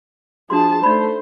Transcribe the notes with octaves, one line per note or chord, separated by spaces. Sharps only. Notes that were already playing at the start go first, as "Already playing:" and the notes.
F3 D4 F#4 G#4 A5 C6
A3 D#4 C5 D5 B5